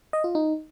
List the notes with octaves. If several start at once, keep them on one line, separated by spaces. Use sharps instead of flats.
D#5
F4
D#4